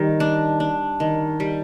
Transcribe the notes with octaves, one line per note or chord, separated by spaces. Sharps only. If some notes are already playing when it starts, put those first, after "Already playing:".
Already playing: D#3 G3
D4
D4
D#3
G3